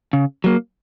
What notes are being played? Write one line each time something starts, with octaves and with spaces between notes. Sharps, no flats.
C#3
F#3 A#3